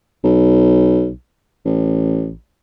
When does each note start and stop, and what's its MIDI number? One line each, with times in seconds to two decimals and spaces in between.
0.24 1.11 35
1.65 2.33 33